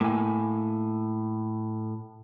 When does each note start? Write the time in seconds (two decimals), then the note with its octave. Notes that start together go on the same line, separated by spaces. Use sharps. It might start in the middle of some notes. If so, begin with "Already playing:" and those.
0.01 A2 A#3 G#5